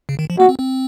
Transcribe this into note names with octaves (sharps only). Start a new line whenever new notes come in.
C#3
D#3
F3
A#3 F#4
C4
C4